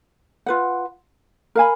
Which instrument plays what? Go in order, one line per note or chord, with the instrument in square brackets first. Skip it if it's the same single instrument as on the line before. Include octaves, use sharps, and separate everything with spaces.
[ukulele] F4 B4 F#5
A#4 F5 G#5 B5